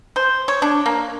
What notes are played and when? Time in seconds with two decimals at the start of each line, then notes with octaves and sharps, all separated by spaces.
0.16 C5
0.48 C#5
0.62 D4
0.86 A#3